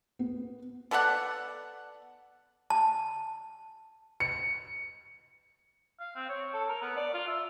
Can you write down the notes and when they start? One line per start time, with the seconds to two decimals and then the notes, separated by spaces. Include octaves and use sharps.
0.19 B3
0.91 B3 A4 D5 F#5
2.70 A5
4.20 C#7
6.00 F5
6.16 C4
6.29 C#5
6.53 A4
6.69 A#4
6.81 B3
6.97 D5
7.13 F4
7.27 E5